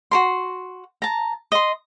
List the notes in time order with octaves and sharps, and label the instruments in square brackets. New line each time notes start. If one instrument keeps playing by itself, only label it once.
[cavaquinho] F#4 A#4 C6
A5 A#5
D#5 C6